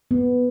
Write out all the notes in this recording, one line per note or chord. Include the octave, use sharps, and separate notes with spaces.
B3